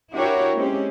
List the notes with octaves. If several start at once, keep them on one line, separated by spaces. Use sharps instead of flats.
D4 E4 F#4 G4 A#4 C#5
G#3 A#3 C4 C#4 G4